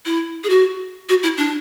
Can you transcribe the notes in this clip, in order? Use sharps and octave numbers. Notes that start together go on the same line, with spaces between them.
E4
G#4
F#4
F#4
E4
D4